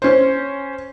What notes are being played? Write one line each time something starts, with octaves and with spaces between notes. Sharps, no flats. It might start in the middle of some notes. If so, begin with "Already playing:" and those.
C#4 C5